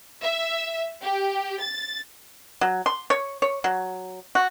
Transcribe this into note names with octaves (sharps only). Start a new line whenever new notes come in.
E5
G4
A6
F#3
C6
C#5
C#5
F#3
F#4